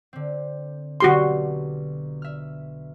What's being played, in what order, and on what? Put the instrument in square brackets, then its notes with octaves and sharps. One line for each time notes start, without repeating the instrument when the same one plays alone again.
[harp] D3 C4
[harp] B1 D3 [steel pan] F#4 G4 C6
[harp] E5 F6